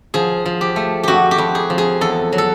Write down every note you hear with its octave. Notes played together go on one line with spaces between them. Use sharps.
F3 G#4
F3
G4
A3
F2 F#4 G4
G4
F2
G#4
F3
G#4
E2 A4
F#3
A4